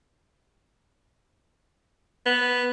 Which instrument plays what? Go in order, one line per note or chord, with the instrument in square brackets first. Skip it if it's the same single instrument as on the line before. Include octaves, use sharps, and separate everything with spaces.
[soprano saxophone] B3